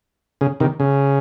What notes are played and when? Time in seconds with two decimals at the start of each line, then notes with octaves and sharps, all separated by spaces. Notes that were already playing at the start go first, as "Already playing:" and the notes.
0.41 C#3
0.60 C3 D#3
0.80 C#3